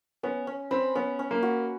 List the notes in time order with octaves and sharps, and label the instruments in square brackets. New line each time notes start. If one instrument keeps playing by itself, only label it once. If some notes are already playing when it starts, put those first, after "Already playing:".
[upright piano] B3 [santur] C#4
[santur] C#4
[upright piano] C4 [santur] B4
[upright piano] B3 [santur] C#4
[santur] C#4
[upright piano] A#3
[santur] F#4